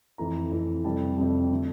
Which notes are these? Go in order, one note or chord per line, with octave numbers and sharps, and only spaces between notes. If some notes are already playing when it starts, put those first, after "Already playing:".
F2 E3 A3 A#5
F2 E3 A3
F2 C3 G3 A5
F2 C3 G3
D3 A3